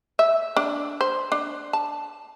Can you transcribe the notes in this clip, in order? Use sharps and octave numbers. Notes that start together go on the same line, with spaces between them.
E5
D4
C5
D4
A5